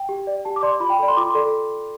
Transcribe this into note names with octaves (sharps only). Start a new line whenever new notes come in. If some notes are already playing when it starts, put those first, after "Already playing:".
Already playing: G5
G4
D5
G4 A5
D6
D5 C6
F4 B5
G5
A4 D5 B5
C6
F4 D6
C6
A4 D5